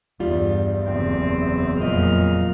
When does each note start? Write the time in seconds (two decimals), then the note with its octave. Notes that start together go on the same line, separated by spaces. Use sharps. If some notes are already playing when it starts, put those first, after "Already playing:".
0.20 E2 G2 G3 F4
0.85 F#1 E2 C4
1.81 F2 A#2 F#3 D#5 F6